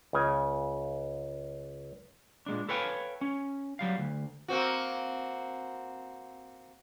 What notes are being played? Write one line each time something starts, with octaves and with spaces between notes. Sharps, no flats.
C#2 C#3 G#5
A#2 G#3 D4
A4 B4 C#5 F5 G5 G#5
C#4
F#3 G3 F5
D2
A#3 C4 F#4